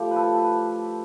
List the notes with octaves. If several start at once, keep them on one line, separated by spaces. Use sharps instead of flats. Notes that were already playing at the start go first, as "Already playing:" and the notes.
Already playing: A2 F3 G4
B4
A4
B4